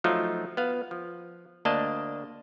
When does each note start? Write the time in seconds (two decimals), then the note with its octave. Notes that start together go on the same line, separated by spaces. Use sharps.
0.04 F3 F#3 A3 D#4 F4
0.57 B3 F5
0.91 F3
1.65 D2 A#3 D4 D#5 A5